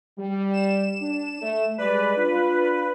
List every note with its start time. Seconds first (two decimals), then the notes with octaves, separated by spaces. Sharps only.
0.18 G3
0.53 E7
1.01 D4
1.41 A3
1.78 G3 G#3 B4 D5
2.17 D4 F4